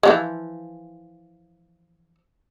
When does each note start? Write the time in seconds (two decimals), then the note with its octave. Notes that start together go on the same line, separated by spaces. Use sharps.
0.03 E3 F3 G#3